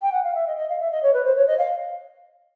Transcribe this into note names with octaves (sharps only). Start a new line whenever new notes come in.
G5
F#5
F5
E5
D#5
D#5
F5
E5
D#5
C#5
B4
C5
C#5
D#5
F5